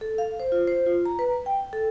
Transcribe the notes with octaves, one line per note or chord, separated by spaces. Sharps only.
A4
F5
C5
F4
C5
F4
A#5
B4
G5
A4